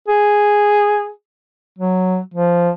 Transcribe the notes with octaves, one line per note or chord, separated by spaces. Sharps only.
G#4
F#3
F3